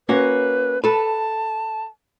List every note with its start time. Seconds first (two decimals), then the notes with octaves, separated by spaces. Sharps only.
0.09 A#3 C#4 F#4 B4
0.84 A4 B4 A5